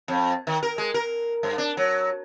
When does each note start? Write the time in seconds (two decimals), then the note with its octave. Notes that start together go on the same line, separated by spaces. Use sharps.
0.08 F2
0.47 D#3
0.63 A#4
0.78 G#3
0.94 A#4
1.43 G2
1.58 D4
1.77 F#3